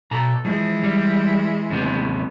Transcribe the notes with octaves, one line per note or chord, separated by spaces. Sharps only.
B2 A4 A#5
E3 F3 G#3
G3
D#2 C3 B3